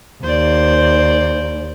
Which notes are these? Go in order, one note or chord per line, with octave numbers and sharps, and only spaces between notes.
D#2 C5 D5